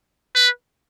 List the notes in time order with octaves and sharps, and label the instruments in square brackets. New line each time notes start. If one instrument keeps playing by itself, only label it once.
[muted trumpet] B4